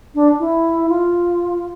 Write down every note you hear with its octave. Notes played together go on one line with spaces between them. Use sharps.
D4
E4
F4